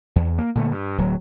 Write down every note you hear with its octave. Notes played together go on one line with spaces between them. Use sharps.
E2
A#3
A#2 D3 A3
G2
D1 F#3